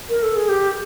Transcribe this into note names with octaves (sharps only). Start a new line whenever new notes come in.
A#4
A4
G#4
G4